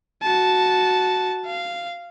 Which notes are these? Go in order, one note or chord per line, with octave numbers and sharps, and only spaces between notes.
F#4 A5
F5